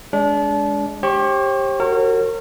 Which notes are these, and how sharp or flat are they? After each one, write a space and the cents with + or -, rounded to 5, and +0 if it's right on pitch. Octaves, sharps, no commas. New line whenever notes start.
G#3 +0 D4 -30
G4 +0 C5 +45 C#6 +10
F#4 +15 A#4 -30 C#5 -40